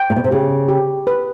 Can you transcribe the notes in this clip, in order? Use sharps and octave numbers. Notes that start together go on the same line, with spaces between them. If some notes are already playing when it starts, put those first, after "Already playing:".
Already playing: G5
A#2
B2
C3
C#3 G4
G4
B4